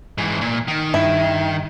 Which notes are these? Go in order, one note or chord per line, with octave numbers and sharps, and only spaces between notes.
G#2 E3
A#2
D#3
G2 E4